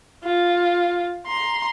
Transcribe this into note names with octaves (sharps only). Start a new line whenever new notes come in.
F4
A#5 C6